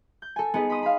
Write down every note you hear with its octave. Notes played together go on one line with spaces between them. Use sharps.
G6
A4 G#5
B3 D#4 G#4 B4
B5 C6 D#6
F5 B5